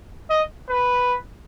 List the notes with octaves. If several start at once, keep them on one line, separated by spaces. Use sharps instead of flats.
D#5
B4